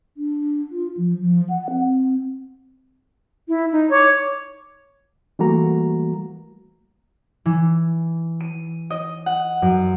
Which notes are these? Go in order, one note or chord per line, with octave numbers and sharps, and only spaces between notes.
D4
F4
F3
F3
F#5
C4
E4
D#4
C#5 D6
E3 G3 A3 A#3 F#4 A#5
E3
D#7
D#5
F#5
F#2